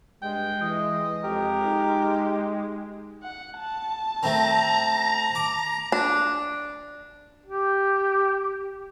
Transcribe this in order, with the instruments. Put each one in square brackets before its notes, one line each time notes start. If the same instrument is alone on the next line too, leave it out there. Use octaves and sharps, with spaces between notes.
[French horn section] G2 [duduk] G#3 [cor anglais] G5
[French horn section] E3 [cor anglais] D#5
[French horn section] F2 [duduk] G#3 [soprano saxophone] G4 [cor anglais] A#4
[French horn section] D#4
[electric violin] F#5
A5
[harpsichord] A3 C4 [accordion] A#5
[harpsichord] D6
[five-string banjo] D4
[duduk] G4